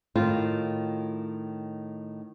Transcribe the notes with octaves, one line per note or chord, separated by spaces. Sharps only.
A2 D#3 F4